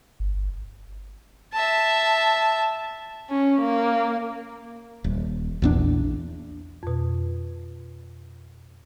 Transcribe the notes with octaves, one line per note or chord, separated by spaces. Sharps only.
G1
E5 A5
C#4
A#3
D#1
A#1 E2 D4
F2 B2